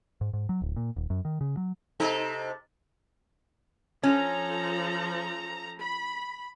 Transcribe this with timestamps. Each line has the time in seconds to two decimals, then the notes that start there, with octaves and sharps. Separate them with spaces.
0.21 G#2
0.33 G#2
0.49 F#3
0.62 D1
0.76 A#2
0.96 D#1
1.10 F#2
1.25 D#3
1.41 C#3
1.57 F#3
2.00 C3 D#4 A4
4.03 F3 C#4 A4 A#5
5.79 B5